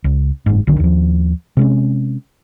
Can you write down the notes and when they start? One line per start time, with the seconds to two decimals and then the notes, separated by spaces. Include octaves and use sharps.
0.04 C#2
0.46 F#1 G#2
0.67 B1 D3 D#3
0.80 D#2 F3
1.57 C3 G#3 C#4